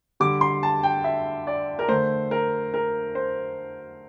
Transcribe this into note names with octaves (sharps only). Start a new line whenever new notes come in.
D3 G3 D6
C6
A5
G5
E5
D5
A#4
D3 A3 C5
A#4
A#4
C5